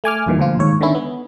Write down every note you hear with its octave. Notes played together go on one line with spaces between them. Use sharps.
A3 G#5 D6 F6
E2 G2 A#2 D#3 E3
D2 A#2 F3 F4
D#2 G#2 C#5
D3 D#3 B3 C#4 E4
B3